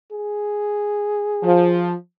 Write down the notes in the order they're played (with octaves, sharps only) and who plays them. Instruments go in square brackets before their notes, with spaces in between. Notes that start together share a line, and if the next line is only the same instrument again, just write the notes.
[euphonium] G#4
[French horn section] F3